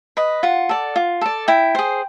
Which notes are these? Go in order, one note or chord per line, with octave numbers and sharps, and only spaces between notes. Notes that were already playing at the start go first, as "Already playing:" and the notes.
B4 D#5
F4 F#5
A4 D5
F4
A4 D5
E4 G5
G#4 C5